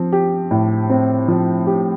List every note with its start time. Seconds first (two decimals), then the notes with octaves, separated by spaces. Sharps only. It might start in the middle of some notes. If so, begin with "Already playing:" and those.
Already playing: F3 C4
0.13 G4
0.51 A2
0.90 C4
1.28 F3
1.67 G4